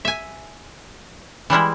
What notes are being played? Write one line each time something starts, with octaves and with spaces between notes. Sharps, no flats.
E5 G#5
E3 G3 G#3 E4